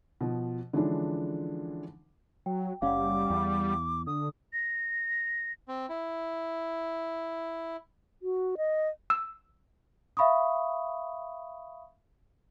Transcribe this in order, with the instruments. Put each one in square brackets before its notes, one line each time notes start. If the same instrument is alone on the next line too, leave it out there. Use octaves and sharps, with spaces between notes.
[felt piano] B2 F3
D3 E3 F3 G#3 C#4 D4
[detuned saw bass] F#3 [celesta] G5
[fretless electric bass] F#1 C#4 [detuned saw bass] G3 [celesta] F5 F#5 [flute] D6
[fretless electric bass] E2
[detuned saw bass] D3 [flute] D#6
[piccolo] A#6
[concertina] C4
E4
[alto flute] F#4
D#5
[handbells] E6
[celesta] E5 F5 B5 C#6 D#6